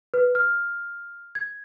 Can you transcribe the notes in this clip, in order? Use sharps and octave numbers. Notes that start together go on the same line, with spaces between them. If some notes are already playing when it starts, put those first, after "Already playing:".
B4
F6
G#6